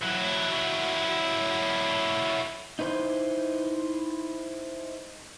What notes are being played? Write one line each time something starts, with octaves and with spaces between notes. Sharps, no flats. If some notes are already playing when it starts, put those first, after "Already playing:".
F#3 E4
D#4 E4 B4 C5